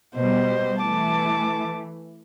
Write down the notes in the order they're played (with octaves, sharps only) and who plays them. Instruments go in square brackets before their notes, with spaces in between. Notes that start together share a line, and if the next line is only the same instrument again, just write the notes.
[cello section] B2 G3 [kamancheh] C5 D#5
[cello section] E3 A3 [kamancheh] A5 D6